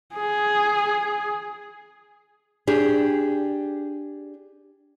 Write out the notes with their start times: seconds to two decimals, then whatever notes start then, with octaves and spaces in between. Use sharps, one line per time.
0.15 G#4
2.67 D4 G4 G#4